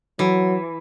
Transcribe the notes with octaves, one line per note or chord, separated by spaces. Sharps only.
E3 F#3